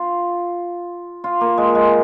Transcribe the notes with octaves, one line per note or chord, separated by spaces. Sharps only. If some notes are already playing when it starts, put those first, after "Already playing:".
Already playing: F4
F4
A#3
G#3
G#3